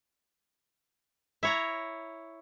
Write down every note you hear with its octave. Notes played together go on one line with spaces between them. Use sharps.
E4 C#5 A#5